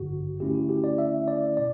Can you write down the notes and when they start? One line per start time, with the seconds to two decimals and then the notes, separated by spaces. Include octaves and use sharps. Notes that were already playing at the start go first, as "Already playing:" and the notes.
Already playing: A1 G2 D3 F#4
0.40 D2 D3 A3 C#4 E4 G4
0.55 F#4
0.69 G4
0.84 D5
0.98 E5
1.28 D5
1.57 B2 D5